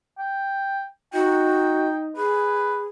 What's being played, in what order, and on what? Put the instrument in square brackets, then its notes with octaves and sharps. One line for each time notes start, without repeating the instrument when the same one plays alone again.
[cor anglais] G5
[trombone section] D#4 [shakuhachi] F#4 [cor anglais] G5
[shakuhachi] G#4 [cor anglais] B4